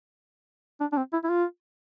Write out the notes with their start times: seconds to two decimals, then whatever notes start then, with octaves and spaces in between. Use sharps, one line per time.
0.81 D4
0.92 D4
0.97 C4
1.13 E4
1.24 E4
1.29 F4